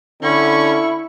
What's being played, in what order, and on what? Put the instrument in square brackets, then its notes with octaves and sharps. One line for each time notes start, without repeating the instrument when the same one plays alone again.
[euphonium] D3 [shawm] C#4 [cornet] E4 [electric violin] B5 C#6